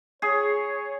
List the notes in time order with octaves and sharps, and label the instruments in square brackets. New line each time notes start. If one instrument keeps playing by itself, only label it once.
[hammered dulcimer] G#4 [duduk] C#5